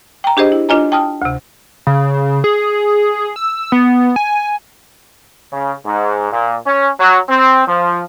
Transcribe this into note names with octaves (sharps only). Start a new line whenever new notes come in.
G5 A#5
D4 G4 G#4 C5 D#5
E4
D4 F4 C#5 D#5 G#5 A#5
G5 A5 D#6 F6
D2 C3
C#3
G#4
E6
B3
G#5
C#3
G#2
A#2
C#4
F#3
C4
F3